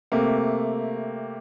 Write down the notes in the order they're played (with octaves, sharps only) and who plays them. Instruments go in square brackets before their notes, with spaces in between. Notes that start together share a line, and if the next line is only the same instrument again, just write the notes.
[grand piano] C3 A3 A#3